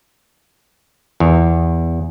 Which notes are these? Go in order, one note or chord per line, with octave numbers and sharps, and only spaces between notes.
E2